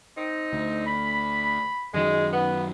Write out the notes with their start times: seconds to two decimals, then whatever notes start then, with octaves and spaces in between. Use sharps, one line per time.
0.17 C4 D#4
0.53 D2
0.86 B5
1.94 F#2 D#3 F#3 G#3
2.33 B3